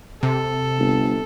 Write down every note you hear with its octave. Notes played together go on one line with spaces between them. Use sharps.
C3 A4
G1